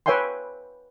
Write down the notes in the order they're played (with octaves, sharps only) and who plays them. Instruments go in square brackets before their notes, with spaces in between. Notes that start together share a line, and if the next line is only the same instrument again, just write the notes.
[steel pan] B4 C#5 E5 G5 G#5 C6